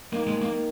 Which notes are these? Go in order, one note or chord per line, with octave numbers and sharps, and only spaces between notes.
D#3 A#3
G#3
A#3